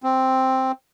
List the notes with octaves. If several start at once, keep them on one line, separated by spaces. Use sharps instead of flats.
C4